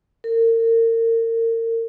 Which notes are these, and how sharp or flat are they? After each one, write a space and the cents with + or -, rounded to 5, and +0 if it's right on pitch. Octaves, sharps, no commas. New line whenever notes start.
A#4 -35